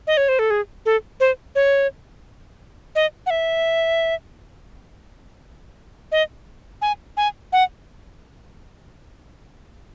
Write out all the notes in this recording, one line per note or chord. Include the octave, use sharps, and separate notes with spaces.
D#5
C#5
C5
A4
G#4
A4
C5
C#5
D#5
F#5
E5
D#5
G#5
G#5
F#5